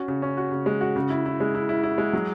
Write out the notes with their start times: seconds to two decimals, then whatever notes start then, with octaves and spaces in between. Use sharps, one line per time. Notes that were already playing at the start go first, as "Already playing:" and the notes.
Already playing: C#4 F#4
0.08 C#3
0.22 C#4
0.37 F#4
0.51 C#3
0.66 G#3
0.81 F#4
0.96 C#3
1.10 E4
1.26 E4
1.40 G#3
1.54 E4
1.69 E4
1.83 E4
1.98 G#3
2.13 F#3